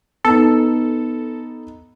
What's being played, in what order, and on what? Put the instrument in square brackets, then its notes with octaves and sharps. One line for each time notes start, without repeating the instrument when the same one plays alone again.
[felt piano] B3 D#4 [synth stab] A4